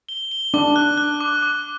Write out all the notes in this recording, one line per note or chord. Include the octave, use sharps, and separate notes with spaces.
G7
G7
D4 D6
F#6
F#6
D6
D6